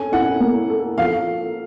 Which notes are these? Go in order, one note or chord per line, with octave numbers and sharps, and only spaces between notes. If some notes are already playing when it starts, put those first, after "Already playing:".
Already playing: C#4 A4 G#5
E4 F#5
A#3
A4
F3 F5